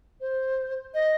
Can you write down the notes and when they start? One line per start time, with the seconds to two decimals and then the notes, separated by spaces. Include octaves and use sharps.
0.20 C5
0.94 D#5